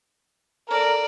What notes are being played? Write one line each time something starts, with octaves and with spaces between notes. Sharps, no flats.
A4 A#4 D5